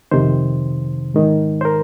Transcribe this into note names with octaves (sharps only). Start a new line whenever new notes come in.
F2 C3 D#3 C5
G#2 D#3
C5
A#4